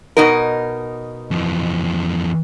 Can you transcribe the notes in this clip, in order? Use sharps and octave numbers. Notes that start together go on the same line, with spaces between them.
B2 D#4 A#4
F2 E3